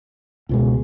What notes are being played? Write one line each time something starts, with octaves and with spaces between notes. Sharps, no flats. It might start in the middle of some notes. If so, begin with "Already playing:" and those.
C#2 B2 G#3